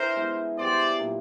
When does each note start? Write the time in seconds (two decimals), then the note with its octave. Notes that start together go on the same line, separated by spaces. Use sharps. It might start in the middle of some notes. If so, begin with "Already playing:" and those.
Already playing: E3 D4 A#4 C5
0.16 G#3 B3 E4
0.57 G3 B3 E4 C5 D5
0.99 A#2 F#3 A#3 D4